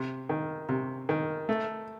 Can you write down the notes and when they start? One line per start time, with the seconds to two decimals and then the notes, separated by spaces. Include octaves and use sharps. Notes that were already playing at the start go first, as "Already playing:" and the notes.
Already playing: C3
0.29 D#3
0.69 C3
1.09 D#3
1.49 A3